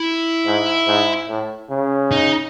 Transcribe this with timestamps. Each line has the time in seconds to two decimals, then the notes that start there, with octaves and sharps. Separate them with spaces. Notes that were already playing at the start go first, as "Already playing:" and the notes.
Already playing: E4
0.46 G#2
0.88 G#2
1.29 A2
1.70 C#3
2.11 D#4